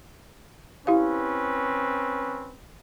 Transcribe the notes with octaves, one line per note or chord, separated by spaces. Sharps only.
C4 C#4 E4 G4 B4 F5